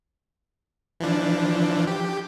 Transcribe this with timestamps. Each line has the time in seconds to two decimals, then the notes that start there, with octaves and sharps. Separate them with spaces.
1.00 E3 F3 D4
1.87 G4